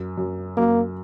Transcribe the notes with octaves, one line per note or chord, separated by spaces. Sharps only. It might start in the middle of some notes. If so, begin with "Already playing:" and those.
Already playing: F#2
F#2
F#2 A#3